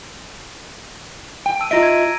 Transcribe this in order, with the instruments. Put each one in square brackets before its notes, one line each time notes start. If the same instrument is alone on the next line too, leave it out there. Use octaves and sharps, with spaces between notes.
[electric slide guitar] G5
[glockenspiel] A5 E6 D#7
[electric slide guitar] F4 D#5 E5 [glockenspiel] A#5 A#6 D7
[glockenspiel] G#6 D#7